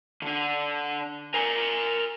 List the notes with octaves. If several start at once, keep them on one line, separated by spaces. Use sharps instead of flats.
D3 D4
A#4 G#5